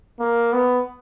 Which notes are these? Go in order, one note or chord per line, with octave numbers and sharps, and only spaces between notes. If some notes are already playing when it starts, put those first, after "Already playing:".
A#3
B3